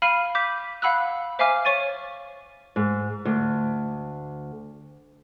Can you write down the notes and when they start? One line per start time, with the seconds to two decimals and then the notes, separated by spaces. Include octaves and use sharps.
0.02 F5 B5 F6 C7 D#7
0.35 D6 G6 B6
0.82 F5 F#5 B5 E6 F#6
1.39 C5 E5 F5 G#5 D6 F6
1.65 C#5 C#6 A6 D#7
2.76 G#2
3.25 D2